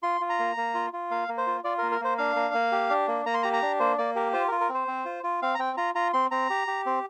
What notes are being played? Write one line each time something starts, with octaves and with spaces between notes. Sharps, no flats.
F4 C6
F4
A#5
A#3
A#3
F4
F4
A#3 F5
A#3
C5
F4
F4 D5
A#4
A#3
A#4
A#3 C5
D4 F5
A#3
A#3
G4
D4
A#3
A#3 A#5
C6
G4 A#5
A#5
D4
A#3 C5
A#3 D5
G4 A#4
F4 C5
F4 A#4
A#4
C4 C5
C4
F4
F4
C4 F5
A#5
C4 G5
F4 A#5
F4 A#5
C4 C6
C4 A#5
G4
G4
C4